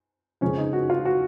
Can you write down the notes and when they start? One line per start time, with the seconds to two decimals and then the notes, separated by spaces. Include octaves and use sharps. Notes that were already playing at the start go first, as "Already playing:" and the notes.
0.41 F2 C#3 G#3 C#4
0.58 D#4
0.73 F#4
0.90 F4
1.05 F#4